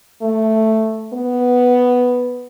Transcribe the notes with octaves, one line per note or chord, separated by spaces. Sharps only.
A3
B3